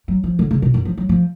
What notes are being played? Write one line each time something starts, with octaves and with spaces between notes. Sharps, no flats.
F#3
F3
D3
C#3
B2
F#2
F3
F#3
F3